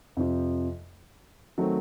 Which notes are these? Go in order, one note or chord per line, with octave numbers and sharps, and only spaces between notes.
F2 C3 F3
D#3 F#3 A3 C4